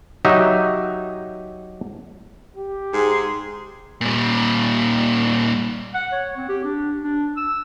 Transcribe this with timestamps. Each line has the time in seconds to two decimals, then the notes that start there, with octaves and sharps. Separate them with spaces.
0.25 F#3 D#4 G4 E5
2.56 G4
2.93 G#2 G#4 C6
4.01 A#2 G3
5.94 F#5
6.12 C#5
6.37 C4
6.49 G4
6.64 D4
7.03 D4
7.37 E6